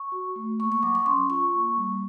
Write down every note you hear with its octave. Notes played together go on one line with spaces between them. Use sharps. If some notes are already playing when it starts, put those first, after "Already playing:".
Already playing: C#6
F#4
A3
A#3 C#6
C#6
F#3 D6
C#6
C#4 C6
F4 C#6
A#3
G3